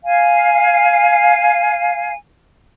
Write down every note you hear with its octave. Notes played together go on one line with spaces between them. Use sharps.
F5 G#5